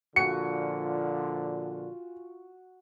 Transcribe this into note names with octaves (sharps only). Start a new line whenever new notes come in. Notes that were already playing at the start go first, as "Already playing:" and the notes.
A#2 D3 F3 F4 F#4 G#5 C#7